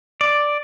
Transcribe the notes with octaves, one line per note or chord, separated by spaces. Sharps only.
D5